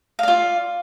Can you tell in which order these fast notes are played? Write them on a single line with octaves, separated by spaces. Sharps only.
F5 D5 F4